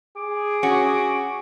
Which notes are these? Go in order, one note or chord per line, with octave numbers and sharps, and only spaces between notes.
G#4 D6
C#4 F#4